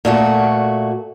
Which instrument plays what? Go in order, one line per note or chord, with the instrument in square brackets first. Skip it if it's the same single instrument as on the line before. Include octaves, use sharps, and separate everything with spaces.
[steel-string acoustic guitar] A#2 A3 F#4